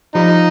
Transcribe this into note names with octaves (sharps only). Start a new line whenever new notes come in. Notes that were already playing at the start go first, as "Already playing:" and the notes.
F3 G3 D#4